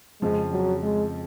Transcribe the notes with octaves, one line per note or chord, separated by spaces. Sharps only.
F2 C#3 F3 G#3
F#3
G#3